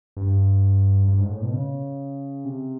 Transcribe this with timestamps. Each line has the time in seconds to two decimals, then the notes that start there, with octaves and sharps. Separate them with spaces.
0.17 G2
1.08 G2
1.20 G#2
1.31 A2
1.42 B2
1.54 C#3
2.45 C3